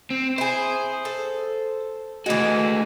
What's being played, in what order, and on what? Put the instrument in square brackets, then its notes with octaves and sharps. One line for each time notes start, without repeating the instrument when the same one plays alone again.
[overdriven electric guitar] C4
[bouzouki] E4 G#4 [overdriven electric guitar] C5
[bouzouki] A4
[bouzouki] E3 G#3 [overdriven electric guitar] A3 F#4